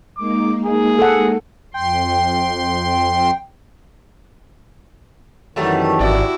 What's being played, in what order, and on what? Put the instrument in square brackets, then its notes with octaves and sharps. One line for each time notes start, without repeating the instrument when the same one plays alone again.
[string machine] G#3 A#3 D#4 [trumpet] D6
[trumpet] G#4
[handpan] A4 F#5
[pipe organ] F2 C6 [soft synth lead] G5
[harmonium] F#2 D#3 E3 [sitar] F#3 G3 A3
[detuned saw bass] G#1 [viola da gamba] E4 F#4 [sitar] D5